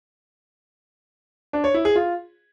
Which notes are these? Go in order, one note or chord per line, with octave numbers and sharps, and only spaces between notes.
D4
C#5
E4
G#4
F4